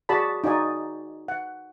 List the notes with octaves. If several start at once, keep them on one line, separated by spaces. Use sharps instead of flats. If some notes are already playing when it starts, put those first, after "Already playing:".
F#4 G#4 D5 A5 B5
D#4 F#4 D5 G#5 D#6
F#5